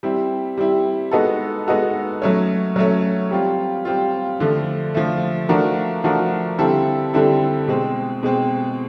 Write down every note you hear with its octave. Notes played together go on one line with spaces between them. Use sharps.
G3 C4 E4
G3 C4 E4
G#3 B3 D#4 F#4 A4
G#3 B3 D#4 F#4 A4
F#3 A3 C#4
F#3 A3 C#4
G3 C4 F4
G3 C4 F4
D3 F3 A3
D3 F3 A3
F3 A3 D4 F#4 A#4
F3 A3 D4 F#4 A#4
D3 G3 C4 E4 A4
D3 G3 C4 E4 A4
B2 G#3 C4
B2 G#3 C4